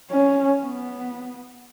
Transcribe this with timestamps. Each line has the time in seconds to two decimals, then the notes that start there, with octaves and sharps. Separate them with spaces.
0.11 C#4
0.62 B3